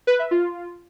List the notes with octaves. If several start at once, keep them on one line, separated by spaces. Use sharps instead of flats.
B4
E5
F4